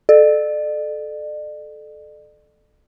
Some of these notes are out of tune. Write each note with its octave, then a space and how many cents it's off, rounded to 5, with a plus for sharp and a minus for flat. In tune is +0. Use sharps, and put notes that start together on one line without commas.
A4 -15 D5 +40